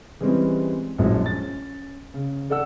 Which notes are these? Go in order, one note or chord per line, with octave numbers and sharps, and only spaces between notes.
E3 G3 G#3 C4 C#4
A#1 F#2 A2 G#3
C#4 A6
C#3
A4 D5 F#5 E6